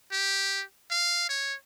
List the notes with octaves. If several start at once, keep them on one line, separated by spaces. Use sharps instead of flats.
G4
F5
C#5